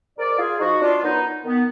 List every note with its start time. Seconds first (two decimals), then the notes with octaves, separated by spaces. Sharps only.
0.18 G#2 A#4 D5
0.38 F4 G#4
0.59 F3 D#4 F#4
0.81 D4 F4
0.97 F4
1.02 F#2 B3 D#4
1.44 D#3 B3